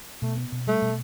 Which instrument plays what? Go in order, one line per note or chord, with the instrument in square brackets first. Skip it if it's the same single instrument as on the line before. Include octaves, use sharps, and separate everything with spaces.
[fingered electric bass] B2 [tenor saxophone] A3
[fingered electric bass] B3
B2
[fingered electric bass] G3 [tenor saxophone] A3
[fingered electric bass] B2